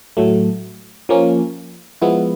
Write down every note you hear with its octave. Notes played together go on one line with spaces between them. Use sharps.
A2 F#3 A3
F3 A#3 C#4
F3 G#3 B3 E4